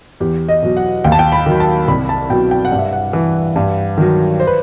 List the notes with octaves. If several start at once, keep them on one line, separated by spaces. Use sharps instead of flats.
E2 G4
D#5
B2 F#3
F#5
D#2 G5
A5
G5
B5
D#3 F#3
A5
C2 B5
A5
B2 F#3 G5
G5
F#5
G2
E5
F#5
E3
G2
D#3 F#3
C5
B4